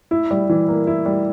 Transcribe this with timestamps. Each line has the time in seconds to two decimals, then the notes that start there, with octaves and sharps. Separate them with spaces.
0.11 E4
0.31 G3
0.50 E3
0.68 A#3
0.87 E4
1.06 G3